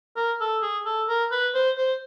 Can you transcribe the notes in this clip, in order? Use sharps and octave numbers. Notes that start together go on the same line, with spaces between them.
A#4
A4
G#4
A4
A#4
B4
C5
C5